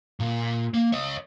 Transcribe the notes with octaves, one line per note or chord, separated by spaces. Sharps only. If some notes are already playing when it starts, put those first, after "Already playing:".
A#2
A#3
C#5 D#5